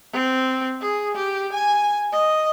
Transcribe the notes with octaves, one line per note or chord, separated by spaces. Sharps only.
C4
G#4
G4
G#5
D#5